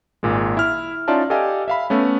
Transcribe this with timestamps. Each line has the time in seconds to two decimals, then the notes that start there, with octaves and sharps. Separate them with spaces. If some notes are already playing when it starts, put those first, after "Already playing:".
0.23 G#1 A#2 G#3
0.57 E4 F6
1.08 C#4 D#4 F4 D5 E5 A5
1.30 G4 A4 D5 D#5 F5 G#5
1.68 E5 F5 B5
1.90 A3 B3 C#4